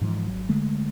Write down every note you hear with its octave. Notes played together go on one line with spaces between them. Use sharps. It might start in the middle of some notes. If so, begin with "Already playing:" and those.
G#2 E3 F3
G#1 F#3
D3 G#3 A3